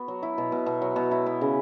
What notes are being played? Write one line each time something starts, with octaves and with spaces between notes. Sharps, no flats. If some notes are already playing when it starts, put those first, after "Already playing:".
Already playing: B3 F#4
F#3
E4
B2
B2
B2
F#3
B2
E4
B3
C#3